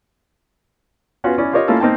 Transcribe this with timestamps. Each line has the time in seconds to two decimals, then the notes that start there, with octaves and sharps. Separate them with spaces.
1.24 B3 C#4 F4 F#4
1.38 C#4 E4 D5
1.53 F4 G4 A#4 C#5 D#5
1.68 A3 A#3 C#4 E4 F4 A4
1.80 A#3 C4 D#4 G5 A5